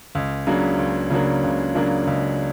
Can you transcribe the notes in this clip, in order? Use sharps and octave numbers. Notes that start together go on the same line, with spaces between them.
C#2
C#3 F#3 A#3 D4
C#2
C#3 F#3 A#3 D4
C#2
C#3 F#3 A#3 D4
C#2